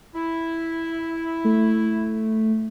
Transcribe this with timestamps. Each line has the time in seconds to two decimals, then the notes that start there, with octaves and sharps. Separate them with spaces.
0.15 E4
1.45 A3